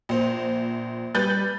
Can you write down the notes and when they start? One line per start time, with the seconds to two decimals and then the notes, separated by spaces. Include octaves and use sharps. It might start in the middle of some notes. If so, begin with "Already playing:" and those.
0.09 A#1 C5
1.15 G3 B4 F#6 G6 A6